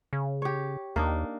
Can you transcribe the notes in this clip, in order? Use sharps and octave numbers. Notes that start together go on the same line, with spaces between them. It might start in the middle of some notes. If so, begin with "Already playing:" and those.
C#3
G4 C#5
D#2 A#3 D4 D#4